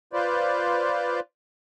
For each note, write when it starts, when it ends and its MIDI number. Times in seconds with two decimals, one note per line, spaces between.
0.13 1.20 65
0.13 1.20 71
0.13 1.20 72
0.13 1.20 74